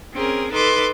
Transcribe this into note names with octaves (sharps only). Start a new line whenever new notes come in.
C4 C#4 G#4 A#4
D#4 A4 B4 C6 D6